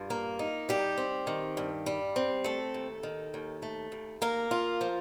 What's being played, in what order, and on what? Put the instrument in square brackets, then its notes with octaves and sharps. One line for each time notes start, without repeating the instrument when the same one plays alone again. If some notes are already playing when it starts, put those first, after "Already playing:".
Already playing: [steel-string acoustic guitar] G2 F4
A#3
D#4
G3 G4
C4
D#3
G2
G3
C4
A3 A4
D#2
D#3
D#2
A3
D#2
A#3 A#4
F4
F3